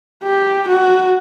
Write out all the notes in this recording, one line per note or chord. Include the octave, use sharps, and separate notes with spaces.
G4
F#4